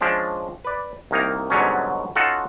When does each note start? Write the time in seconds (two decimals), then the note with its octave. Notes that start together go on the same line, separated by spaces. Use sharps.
0.01 F3 G#3 C#4 D4
0.64 B4 D5
1.11 C2 D#3 A#3 D#4 A#5
1.50 G#2 B2 D3 F#3 G3 C#4
2.16 C#4 D#4 F4 F#4 A4 F#5